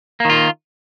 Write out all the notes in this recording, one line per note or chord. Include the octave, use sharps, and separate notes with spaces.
D#3 A#3 F4